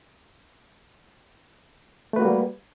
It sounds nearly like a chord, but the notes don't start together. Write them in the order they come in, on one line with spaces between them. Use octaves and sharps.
A3 B4 F#4 A#3 G3